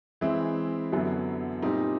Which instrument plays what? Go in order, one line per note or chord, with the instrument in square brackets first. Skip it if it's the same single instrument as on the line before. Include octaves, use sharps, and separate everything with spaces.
[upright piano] E3 G#3 C4 E4
F#2 D3 F#3 B3 E4
A#2 G3 C4 D#4